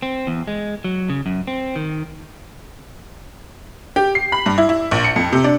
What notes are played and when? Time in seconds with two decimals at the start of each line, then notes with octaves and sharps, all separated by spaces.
0.02 C4
0.27 E2
0.48 G#3
0.84 F#3
1.10 C#3
1.26 F#2
1.47 C4
1.76 D#3
3.96 G4
4.15 C7
4.32 B5
4.46 G2
4.58 E4
4.69 E4
4.91 A#1
5.04 C#7
5.16 F2
5.32 C3
5.44 D4